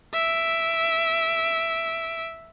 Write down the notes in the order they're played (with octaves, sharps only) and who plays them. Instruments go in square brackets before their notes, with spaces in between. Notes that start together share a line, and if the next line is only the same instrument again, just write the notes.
[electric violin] E5 D7